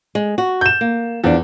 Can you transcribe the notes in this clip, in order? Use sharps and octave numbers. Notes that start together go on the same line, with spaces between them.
G#3
F#4
G6 E7
A#3
E2 F3 D4